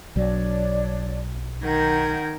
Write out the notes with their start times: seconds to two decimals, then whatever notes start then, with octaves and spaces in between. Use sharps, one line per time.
0.16 B1 F#3 D4 C#5 D5
1.63 D#3 A#4 F#5 G6 G#6